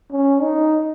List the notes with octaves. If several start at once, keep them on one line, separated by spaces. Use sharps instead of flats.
C#4
D#4